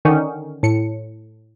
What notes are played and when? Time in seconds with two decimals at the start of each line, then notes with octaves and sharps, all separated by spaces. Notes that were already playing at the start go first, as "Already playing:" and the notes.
0.05 D3 D#3 C#4 D#4
0.63 A2 C#7